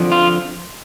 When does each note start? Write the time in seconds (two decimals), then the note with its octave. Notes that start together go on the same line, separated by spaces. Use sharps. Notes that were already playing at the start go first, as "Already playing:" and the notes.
Already playing: F2 D3 F3
0.12 F4